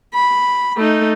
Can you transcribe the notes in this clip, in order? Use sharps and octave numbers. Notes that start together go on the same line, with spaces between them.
B5
A3 D#4